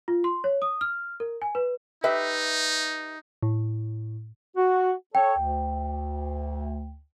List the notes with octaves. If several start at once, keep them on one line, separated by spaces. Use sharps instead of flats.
F4
C6
C#5
D#6
F6
A#4
G#5
B4
D#4 G4 B4 E5
A2
F#4
A4 C#5 G5
D2